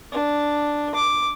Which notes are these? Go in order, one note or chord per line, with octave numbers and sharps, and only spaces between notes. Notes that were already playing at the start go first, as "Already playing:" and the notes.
D4
D6